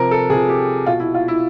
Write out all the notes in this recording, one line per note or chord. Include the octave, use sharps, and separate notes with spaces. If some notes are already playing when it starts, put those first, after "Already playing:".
Already playing: C3 F3 A#4
A4
C3 F3 G#4
G4
B2 F4
E4
F4
E4